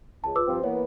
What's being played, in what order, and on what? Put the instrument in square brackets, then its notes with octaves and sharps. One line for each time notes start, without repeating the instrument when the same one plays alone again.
[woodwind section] C#2 [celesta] A5
[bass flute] F4 [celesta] B4 D6 E6
[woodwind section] G2 F3 C4
[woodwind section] E3 B3 [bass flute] A#3 [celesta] C#5